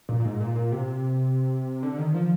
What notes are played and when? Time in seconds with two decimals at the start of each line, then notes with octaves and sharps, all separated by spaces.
0.09 A#2
0.20 A#2
0.25 G#2
0.40 A#2
0.56 A#2
0.72 C3
1.83 D3
1.98 D#3
2.14 F3